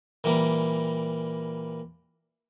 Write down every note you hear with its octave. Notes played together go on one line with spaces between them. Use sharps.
A#2 E3 G3 A#3